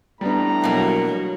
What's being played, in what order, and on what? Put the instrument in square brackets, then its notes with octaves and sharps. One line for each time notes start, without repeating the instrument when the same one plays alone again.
[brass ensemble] A2 A#5 [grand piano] G3 B3 D4
[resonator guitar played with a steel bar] B2 A#3 [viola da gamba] F#3